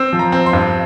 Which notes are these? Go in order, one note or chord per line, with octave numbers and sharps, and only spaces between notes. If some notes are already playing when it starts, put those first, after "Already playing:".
Already playing: C4 E6
F3
A#5
C4
C6
G2